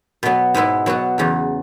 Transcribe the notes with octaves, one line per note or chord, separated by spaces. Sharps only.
B2 F#3 B3
G#2 G#3 B3 E4
B2 F#3 B3 F#4
E2 C#3 F#3